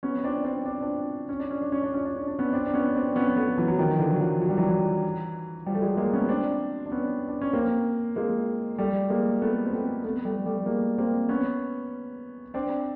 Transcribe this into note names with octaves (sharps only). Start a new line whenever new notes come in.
B3 C#4
C4 D4
C4 D4
D4
C4 D4
C#4
D4
C#4
D4
C#4
D4
C#4
D4
C#4
D4
B3 C#4
C4 D4
D4
B3 C#4
C4 D4
B3 C#4
A3 B3
E3 F#3
F#3
D#3 F3
D3 E3
F#3
D#3 F3
F#3
G3
E3 F#3
F3 G3
A3
F#3 G#3
G#3 A#3
B3 C#4
C4 D4
D4
B3 C#4
D4
C#4
A#3 C4
G#3 A#3
G3 A3
G#3 A#3
A3 B3
C4
A3 B3
A3 B3
G3 A3
G3 A3
G#3 A#3
A#3 C4
B3 C#4
C4 D4